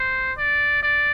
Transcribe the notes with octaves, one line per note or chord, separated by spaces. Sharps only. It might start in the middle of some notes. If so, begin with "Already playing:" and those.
Already playing: C5
D5
D5